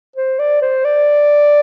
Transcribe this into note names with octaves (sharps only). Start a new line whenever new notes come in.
C5
D5
C5
D5